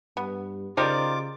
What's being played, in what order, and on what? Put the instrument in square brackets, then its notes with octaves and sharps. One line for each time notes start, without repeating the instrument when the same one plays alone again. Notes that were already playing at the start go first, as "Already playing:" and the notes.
[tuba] G2 [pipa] B3
[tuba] C#3 [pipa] D#4 G4 A#4 [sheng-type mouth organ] F4 D6 [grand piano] C5 D5